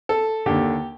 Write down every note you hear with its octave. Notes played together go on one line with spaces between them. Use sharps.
A4
D#2 D3 G4